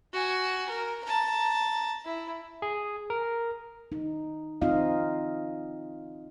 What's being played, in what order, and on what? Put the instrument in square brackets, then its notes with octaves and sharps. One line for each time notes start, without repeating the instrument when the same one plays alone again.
[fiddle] F#4 G#5
A#4
A5 A#5
E4
[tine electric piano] G#4
A#4
[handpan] D#4
C4 D#4 F4 D#5 F5